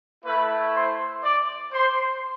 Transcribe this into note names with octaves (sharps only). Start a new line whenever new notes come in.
A3 E4 B4 B5
C5 C6
D5 D6
C5 C6